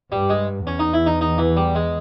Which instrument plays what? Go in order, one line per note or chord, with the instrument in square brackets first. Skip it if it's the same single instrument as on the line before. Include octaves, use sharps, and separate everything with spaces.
[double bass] G2 [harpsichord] G3
[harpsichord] G#3
[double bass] E2 [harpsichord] C#4
[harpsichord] D#4
E4
D#4
D#4
E3
G3
G#3